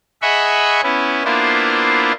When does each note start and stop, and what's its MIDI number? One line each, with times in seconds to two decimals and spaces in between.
0.22 0.81 68
0.22 0.81 75
0.22 0.81 76
0.22 0.81 78
0.22 0.81 83
0.22 0.81 85
0.83 1.24 59
0.83 1.24 61
0.83 1.24 64
1.25 2.12 58
1.25 2.12 59
1.25 2.12 62
1.25 2.12 64
1.25 2.12 65
1.25 2.12 72